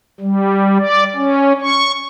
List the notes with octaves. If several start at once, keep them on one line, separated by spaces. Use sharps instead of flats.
G3
D5
C#4
C#6